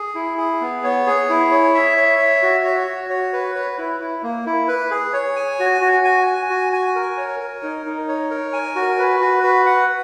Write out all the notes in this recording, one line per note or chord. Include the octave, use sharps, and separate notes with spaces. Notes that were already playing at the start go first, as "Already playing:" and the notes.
Already playing: G#4
E4
G#4
B3
C#5
G#4
E4
C#5
E5
C#5
E5
F#4
C#5
F#4
C#5
B4
B4
E4
E4
A#3
E4
B4
G#4
C#5
G#5
F#4
F#4
G#5
G#5
F#4
G#5
A#4
C#5
A#4
D#4
D#4
C#5
A#4
G#5
F#4
B4
F#4
B4
F#5